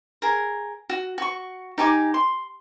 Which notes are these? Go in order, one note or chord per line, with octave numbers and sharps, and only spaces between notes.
G#4 A#4
F#4
F#4 C#6
D#4 G4 G#5 D6
C6